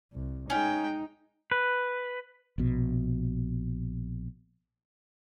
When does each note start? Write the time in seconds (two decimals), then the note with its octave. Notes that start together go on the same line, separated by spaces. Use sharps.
0.14 C2
0.50 G#3 C#4 D#4 G5
1.51 B4
2.58 A#1 B2